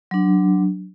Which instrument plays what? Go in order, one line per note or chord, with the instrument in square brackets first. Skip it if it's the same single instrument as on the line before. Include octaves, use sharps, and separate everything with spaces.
[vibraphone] F#3 D4